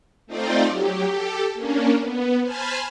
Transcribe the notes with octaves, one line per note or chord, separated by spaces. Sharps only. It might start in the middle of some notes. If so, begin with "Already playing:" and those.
A3 C4 D#4 F4 C5 D5
F#3 G4
G4 A4
A#3 C#4 D4
B3
C5 G#5 A5 B5 F6